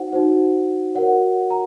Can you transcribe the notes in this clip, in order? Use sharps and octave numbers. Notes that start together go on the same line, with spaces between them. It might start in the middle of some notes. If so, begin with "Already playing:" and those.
Already playing: D#4 F#4 C5 F#5
D#4 F#4 C5
F#4 A#4 C#5 F#5
A#5